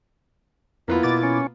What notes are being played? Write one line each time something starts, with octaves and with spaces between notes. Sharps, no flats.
F2 A#3 B3 E4 F4
B2 D6 A6
C#4